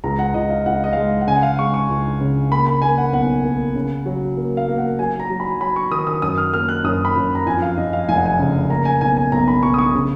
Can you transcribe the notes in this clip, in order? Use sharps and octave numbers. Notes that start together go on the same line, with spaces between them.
C#2 A#5
F#5
C#2 D#5
F5
C#2 F#5
F5
D#5
G#3 F5
F#5
C#3 G#5
F#5
F5
G#3 C#6
C#6
C#2
C#3
A#3 B5
B5
A#3 G#5
F#5
B1 F#5
A#3
C#3
F#3
A#3
F5
A#3
F#5
F#3 G#5
A#5
F#3
B5
F#3 B5
C#6
D#3 D#6
D#6
F#2 D#6
F6
A#3 F6
F#6
F#2 D#6
B5
F#2
A#5
F2 G#5
F5
F2 D#5
F5
F1 G#5
F#5
G#5
C#3
A#3 A#5
G#5
B1 G#5
G#5
B1 A#5
B5
B1 C#6
D#6
C#6
C#3